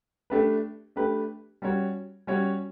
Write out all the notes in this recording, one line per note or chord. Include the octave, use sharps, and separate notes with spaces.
A3 D4 G4 B4
A3 D4 G4 B4
G3 C#4 F#4 C#5
G3 C#4 F#4 C#5